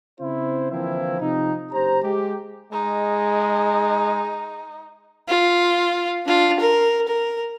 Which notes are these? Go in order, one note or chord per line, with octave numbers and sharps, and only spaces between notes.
C#3 C4 E4 C5
D3 E3 F3 A#3 C4 E4
C3 F3 C4 D#4
F#1 G4 C5 A#5
G#3 G4
G#3 D#4
F4
D4 F4
A#4
A#4